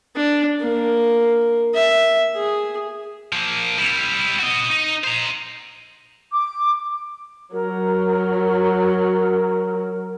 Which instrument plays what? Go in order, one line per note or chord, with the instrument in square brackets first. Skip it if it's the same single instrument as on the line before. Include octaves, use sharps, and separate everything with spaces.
[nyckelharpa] D4
A#3
E5
G#4
[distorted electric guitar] F3 A#3
G3 E4
F#4 D#5
D#4
C5 A#5
[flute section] D6
[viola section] F#3 [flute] A#4